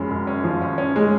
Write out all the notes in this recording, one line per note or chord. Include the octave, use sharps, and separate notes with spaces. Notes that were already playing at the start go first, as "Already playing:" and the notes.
Already playing: F#2 F3 G#3 C#4 B5
F#2
C#4
F3
C#4
C#4
G#3